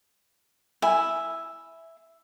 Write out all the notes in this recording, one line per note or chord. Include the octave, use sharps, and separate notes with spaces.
E4 E5 G#5 B5